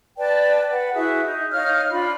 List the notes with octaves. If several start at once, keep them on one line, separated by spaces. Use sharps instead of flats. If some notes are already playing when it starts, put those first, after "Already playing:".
B4 D5 G5 A5
B4 F#5
E4 F#4 G#4 E5
D#4
D#4 C#5 F5 F6
D4 F4 B5